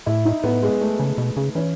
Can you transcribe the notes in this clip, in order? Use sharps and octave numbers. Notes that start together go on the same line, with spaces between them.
A2 E4
D#4
A2 B3
G#3
A3
C#3
B2
C#3
E3 C#4